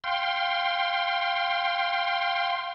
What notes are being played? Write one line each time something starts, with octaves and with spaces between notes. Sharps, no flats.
F5 G5 C6